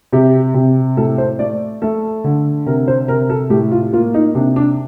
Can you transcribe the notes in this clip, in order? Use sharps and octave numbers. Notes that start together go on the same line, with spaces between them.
C3 G4
C3
A2 A4
C5
A3 D5
A3 A4
D3
C3 A#4
C5
C3 A#4
A4
A2 G4
F4
A#3 F4
D#4
C3 D4
D4